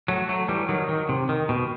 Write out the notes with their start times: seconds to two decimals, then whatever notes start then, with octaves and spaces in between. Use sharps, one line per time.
0.08 F#3 A3
0.29 F#3 A3
0.48 E3 G3
0.69 D#3 F#3
0.89 D#3
1.09 C3
1.29 D#3
1.49 B2